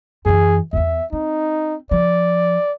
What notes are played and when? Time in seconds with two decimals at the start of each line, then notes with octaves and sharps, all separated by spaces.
0.26 F#2 E3 G#4
0.73 E2 B3 E5
1.13 C4 D#4
1.91 F3 D5